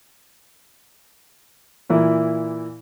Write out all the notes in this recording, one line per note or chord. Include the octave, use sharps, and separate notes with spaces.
A#2 E3 A#3 E4